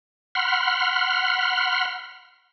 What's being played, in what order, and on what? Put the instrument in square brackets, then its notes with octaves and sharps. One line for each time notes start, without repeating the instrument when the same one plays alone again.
[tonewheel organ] F#5 B5 C6 F6